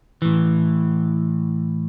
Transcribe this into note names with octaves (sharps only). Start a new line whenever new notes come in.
A2 E3